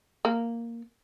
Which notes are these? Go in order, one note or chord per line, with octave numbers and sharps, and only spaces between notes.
A#3